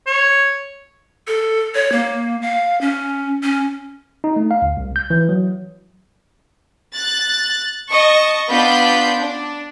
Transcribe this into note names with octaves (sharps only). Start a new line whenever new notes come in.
C#5
A4
C#5
A#3
F5
C#4
C#4
D#4
A3
F5
D2
C2
G6
E3
F#3
F#6 A6
D#5 A5 C#6
B3 D4 F4 B5 G6
D4